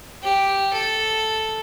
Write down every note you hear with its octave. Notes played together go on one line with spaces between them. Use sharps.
G4
A4